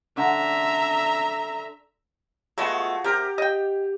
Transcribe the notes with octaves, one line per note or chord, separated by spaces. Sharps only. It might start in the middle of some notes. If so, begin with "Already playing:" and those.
D3 E5 A#5
G#3 A3 B3 F4 F#4 G#4
C3 G4 A#4
D#5 G5